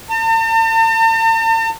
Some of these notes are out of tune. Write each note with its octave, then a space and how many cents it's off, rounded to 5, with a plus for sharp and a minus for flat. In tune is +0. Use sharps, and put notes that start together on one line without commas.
A5 +45